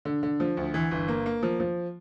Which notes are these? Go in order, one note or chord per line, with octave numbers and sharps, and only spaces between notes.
D3
D3
F3
D2
E3
G1
A#3
A#3
F3
F3